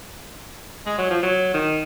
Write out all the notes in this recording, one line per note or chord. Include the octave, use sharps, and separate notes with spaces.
G#3
F#3
F3
F#3
D#3